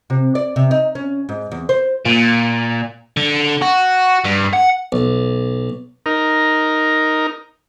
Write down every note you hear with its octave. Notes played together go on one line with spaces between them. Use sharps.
C3
D5
C3
D#4
C#4
G#2
E2
C5
A#2
D3
F#4
G2
F#5
B1
D#4 A#4